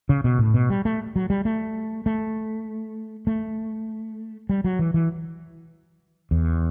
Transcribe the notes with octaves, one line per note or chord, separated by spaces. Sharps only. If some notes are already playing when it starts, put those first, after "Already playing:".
C#3
B2
A2
B2
G3
A3
F#3
G3
A3
A3
A3
G3
F#3
E3
E3
E2